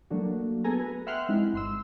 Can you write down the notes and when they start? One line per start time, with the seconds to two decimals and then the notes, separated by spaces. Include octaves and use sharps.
0.10 F#3 A3 A#3 D4 F#4
0.64 B3 G#4 A4 G#5 A#5
0.79 B4
1.07 E5 F#5 G5 C6 F6 F#6
1.29 G#3 C4 D#4 E4
1.53 G1 C6 E6